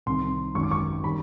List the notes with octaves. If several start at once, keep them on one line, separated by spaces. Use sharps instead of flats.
C2 C3 D#3 C6
G#1 F#2 D#3 C#6
D6
C#6
D#3 G3 B5